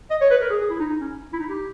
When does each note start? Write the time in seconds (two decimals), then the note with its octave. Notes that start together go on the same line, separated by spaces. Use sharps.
0.11 D#5
0.21 C#5
0.30 B4
0.41 A#4
0.50 G#4
0.61 G#4
0.70 E4
0.80 D#4
0.90 D#4
1.00 C#4
1.33 E4
1.39 D#4
1.49 G4